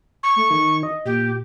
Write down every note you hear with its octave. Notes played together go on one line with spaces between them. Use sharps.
C#6
A3
D#3
D#5
A#2 G4